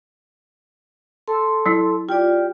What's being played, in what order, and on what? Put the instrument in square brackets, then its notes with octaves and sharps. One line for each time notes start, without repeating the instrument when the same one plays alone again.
[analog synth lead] A4 [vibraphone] C6
[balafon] F#3 E4
[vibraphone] F4 D5 [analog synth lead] G4